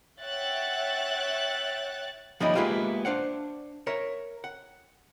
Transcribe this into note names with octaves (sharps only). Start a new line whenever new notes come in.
C#5 E5 F#5 G5 F#6 A6
F3 G3 A#3 C#4 D#4 E4
G#3 A#3 B3 E4 F4 G4
D4 C5 F5 F#5
A#4 C#5 E5
F#5